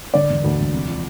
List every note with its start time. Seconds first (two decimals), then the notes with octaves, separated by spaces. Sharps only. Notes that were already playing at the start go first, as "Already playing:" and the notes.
0.14 D3 D5
0.30 E1
0.44 D2
0.59 E1
0.74 C3
0.88 F3